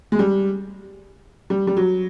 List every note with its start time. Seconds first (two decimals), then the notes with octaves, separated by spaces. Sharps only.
0.12 G#3
0.19 G3
1.50 G3
1.67 G3
1.77 F#3